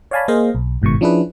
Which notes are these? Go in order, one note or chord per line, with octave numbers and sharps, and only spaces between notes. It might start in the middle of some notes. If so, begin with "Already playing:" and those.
C#5 D5 F5 G#5 A5 B5
A#3 G#4 C5 D#5 F5
B1
G1 G#2 B2 D#3 C#6
F3 C#4 D4 E4 G#4 B4